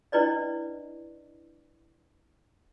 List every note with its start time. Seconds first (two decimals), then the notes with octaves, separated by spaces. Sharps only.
0.12 C#4 D4 E4 B4 D5 D#5